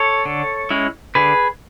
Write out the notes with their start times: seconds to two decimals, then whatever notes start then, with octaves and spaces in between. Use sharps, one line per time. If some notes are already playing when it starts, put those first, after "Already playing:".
Already playing: A4 C#5
0.25 D3
0.70 G#3 C#4 E4
1.15 D3 G#4 B4